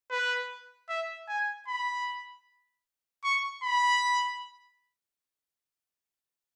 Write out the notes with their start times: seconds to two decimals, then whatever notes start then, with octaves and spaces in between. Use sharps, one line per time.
0.11 B4
0.89 E5
1.28 G#5
1.68 B5
3.24 C#6
3.63 B5